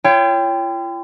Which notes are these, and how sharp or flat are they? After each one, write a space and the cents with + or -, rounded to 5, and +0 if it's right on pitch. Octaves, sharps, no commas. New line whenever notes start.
F4 -45 C#5 +15 G5 +10